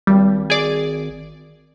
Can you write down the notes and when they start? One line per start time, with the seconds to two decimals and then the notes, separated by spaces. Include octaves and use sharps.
0.07 G#1 G3
0.50 G#4 D5